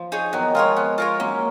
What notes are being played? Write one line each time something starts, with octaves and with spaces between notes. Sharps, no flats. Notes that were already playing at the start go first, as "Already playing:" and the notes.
Already playing: F3
D#4 G#4 C#5
D#3 F#3 B3
F3 G#3 F4 A#4 C#5
B3
F4 A#4 C#5
F#3 A#3 C#4